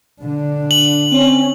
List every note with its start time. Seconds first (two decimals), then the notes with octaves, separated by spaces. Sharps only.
0.22 D3 D4
0.71 F#7
1.11 C4 C#4